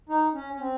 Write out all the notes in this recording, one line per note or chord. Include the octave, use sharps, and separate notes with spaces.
D#4
C#4
C#4
C4